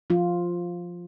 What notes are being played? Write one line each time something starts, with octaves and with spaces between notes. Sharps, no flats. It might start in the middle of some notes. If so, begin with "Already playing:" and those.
F3 F4